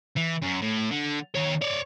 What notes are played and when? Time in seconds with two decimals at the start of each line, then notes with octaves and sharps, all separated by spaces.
0.16 E3
0.42 F#2
0.62 A2
0.91 D3
1.35 D#3 C#5
1.62 C#5 D5